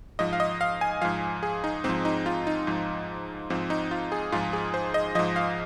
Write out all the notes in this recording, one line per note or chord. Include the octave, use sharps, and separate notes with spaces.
G#2 F3 D#5
F5
D#5
F5
G#5
G#2 F3 F5
G#4
D#4
G#2 F3 C4
D#4
F4
D#4
G#2 F3
G#2 F3 C4
D#4
F4
G#4
G#2 F3 F4
G#4
C5
D#5
G#2 F3 D#5
F5